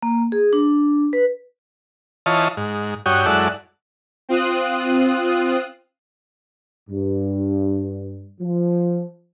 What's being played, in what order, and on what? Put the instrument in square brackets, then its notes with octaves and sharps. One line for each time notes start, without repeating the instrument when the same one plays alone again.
[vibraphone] A#3
G#4
D4
B4
[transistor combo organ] E3 F4 C#5 D#5 A5
G#2
G2 F#4 C#5 G5 D#6
F#2 G#3 E4 A4 D5 F#5
[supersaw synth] C4 F4 D#6 F#6
[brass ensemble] G2
F3